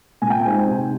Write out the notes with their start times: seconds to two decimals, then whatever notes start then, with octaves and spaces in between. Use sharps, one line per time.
0.22 A#2 G#5
0.30 G5
0.39 G#5
0.45 G#3 C4 D#4
0.68 C3